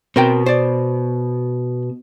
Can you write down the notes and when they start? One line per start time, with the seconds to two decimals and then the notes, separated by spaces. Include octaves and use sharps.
0.16 B2 C4 A#4 G5
0.46 C5 D5